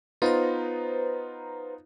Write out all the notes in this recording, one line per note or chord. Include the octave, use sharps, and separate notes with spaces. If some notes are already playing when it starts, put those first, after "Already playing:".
B3 D#4 F4 B4 C5 A#5